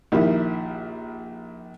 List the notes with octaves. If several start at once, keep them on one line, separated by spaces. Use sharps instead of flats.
A#1 D#3 E4 G4 E5